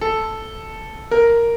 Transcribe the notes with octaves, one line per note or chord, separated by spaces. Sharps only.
A4
A#4